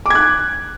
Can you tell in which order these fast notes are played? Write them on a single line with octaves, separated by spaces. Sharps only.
D6 G#6 F#6